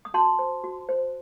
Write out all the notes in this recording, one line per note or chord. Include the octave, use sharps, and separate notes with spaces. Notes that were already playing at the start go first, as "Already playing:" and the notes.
D#6
F#4 A5 C6
C5
F#4
C5